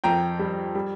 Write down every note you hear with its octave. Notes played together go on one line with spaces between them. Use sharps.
F2 G5 A#5
G3
G3